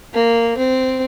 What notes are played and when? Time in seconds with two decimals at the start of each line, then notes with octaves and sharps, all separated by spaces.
0.14 A#3
0.57 C4